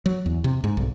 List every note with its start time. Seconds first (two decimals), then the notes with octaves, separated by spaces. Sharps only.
0.06 F#3
0.26 E2
0.44 C3
0.64 G#2
0.77 B1